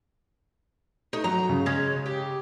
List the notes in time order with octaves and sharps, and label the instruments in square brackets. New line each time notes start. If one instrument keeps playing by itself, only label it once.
[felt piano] A3 [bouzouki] D#4
[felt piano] F#3 [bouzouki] A#5
[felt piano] C#3
[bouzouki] G#3 C#4
G4